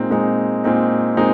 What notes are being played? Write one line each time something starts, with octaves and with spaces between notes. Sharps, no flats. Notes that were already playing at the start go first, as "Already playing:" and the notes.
Already playing: A#2 G#3 C4 D#4
A#2 G#3 C4 D#4
A#2 G#3 C4 D#4
A#2 G#3 C4 D#4